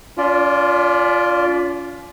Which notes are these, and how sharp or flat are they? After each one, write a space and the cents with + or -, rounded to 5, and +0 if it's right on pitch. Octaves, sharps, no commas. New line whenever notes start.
C#4 +45 F4 +0 D5 +0